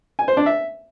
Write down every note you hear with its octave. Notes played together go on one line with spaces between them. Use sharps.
G#5
C5
D4
E5